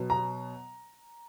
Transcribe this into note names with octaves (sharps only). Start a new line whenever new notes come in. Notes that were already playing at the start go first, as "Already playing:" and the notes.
Already playing: B2 F#3 B3
A#5